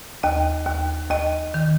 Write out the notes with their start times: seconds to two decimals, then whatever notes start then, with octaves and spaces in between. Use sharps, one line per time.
0.23 D#2 D#5
0.67 D#2
1.10 D#2 D#5
1.54 D#3